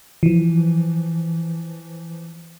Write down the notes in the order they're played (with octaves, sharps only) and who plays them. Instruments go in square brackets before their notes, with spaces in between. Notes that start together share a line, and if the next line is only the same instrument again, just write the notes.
[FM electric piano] E3 F3